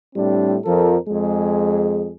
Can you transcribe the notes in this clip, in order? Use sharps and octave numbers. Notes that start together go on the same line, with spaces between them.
A2 G3 C4 D4
F2 F3 A4 A#4
F2 G#3 G#4